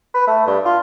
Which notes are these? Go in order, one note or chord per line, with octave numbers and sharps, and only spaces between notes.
B4
A3
G2
F4